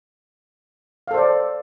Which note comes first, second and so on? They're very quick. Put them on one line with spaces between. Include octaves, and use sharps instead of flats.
F5 A4 C5 D5